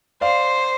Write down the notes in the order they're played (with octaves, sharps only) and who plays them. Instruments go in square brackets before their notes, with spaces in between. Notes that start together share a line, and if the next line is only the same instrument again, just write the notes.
[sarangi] C5 [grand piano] D5 F5